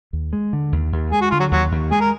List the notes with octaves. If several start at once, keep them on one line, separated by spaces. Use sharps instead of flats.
D#2
G#3
D3
D#2
D#2
G#3 G#4
F#4
D3 F4
F#3 F#4
D#2 F#3 F#4
D#2
G#3 G#4
A#4